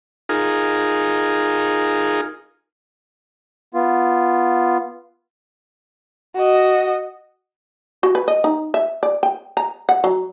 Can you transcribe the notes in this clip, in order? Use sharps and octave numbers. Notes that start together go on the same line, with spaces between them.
D#4 F4 G#4 A#4
B3 F4
F#4 D#5
F#4
B4
D#5
D#4
E5
D5
G5
A#5
F#5
F#3